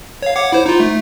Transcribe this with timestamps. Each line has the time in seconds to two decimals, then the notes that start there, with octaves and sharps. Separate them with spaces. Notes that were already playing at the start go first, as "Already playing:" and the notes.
0.22 C#5 F5
0.35 C#5 F#5 D6
0.52 E4 C5
0.66 D#4 F4
0.80 A3